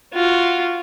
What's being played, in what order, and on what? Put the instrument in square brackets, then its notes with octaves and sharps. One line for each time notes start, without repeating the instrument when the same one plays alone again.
[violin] F4 F#4